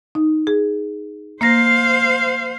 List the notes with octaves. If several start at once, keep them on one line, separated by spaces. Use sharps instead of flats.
D#4
G#4
A#3 C5 F5 A#6